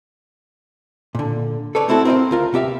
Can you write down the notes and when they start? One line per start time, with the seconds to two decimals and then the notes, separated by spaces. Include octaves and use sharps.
1.15 A#2 D3
1.75 A4 B4 C#5 D5
1.88 A3 C4 E4 F#4 A4
2.05 C4 A#4 B4 D#5 F5 G5
2.31 D2 F4 A#4
2.53 C3 B3 G4 E5 F5